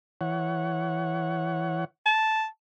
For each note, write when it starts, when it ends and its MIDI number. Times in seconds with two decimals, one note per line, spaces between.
0.21 1.85 52
0.21 1.85 73
0.21 1.85 78
2.06 2.46 81